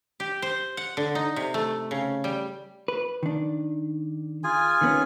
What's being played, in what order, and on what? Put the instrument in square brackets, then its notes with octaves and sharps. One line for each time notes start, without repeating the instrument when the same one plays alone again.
[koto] G4
C5
F#5
D3
D#4
C3
A3
C#3
G3
[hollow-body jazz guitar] B4
D#3 D4
[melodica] F4 G#4 G#5
[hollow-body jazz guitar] D#3 B3 C#4